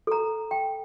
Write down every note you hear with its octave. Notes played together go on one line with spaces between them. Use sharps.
A4 A#5
G5